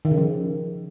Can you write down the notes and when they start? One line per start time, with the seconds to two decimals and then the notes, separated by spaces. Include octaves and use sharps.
0.05 D#3
0.11 C#3
0.18 F3